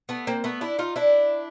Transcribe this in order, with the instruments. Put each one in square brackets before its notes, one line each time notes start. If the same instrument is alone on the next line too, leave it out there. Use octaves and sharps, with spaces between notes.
[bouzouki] A3 B3
A#3 C4
A3 B3
D4 E4
D#4 F4
D4 E4